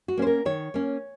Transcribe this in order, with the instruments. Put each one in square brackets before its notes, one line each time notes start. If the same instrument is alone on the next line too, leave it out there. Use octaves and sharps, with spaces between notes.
[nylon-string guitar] F#4
A#3 C#4 C5
A#4
D#3 C#5
A#3 C#4